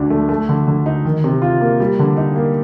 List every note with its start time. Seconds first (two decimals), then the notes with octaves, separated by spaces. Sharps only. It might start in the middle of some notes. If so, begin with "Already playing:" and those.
Already playing: D2 D3 D4
0.10 A3
0.29 A3
0.49 D3
0.67 D3
0.86 D#4
1.05 D#3
1.24 C3
1.42 F4
1.61 A#3
1.80 G3
1.99 D3
2.17 D#4
2.36 A#3